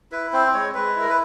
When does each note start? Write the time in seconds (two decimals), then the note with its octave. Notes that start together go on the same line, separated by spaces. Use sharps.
0.12 E4 B4
0.33 C4 C5
0.54 G#3 C#5
0.74 G#3 B4
0.96 E4 A#4
1.09 B4